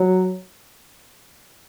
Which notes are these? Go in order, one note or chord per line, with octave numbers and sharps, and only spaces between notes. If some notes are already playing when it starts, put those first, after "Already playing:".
Already playing: F#3